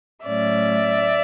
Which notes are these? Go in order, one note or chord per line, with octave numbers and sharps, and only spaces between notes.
A2 F#3 A3 C#4 D5 E5